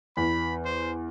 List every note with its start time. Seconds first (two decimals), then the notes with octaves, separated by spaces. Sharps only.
0.17 E2 B5
0.65 C5